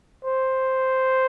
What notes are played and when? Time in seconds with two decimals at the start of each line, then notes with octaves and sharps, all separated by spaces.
0.25 C5